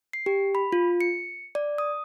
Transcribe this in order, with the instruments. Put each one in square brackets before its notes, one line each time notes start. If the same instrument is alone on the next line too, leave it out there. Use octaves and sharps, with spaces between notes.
[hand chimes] C7
G4
B5
F4
C#7
D5
D#6